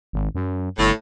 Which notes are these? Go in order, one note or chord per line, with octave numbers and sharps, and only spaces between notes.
G#1
F#2
G1 A2